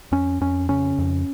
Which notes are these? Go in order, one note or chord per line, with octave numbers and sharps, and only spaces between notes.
F2 C#4
F2 C#4
C#3 C#4
F2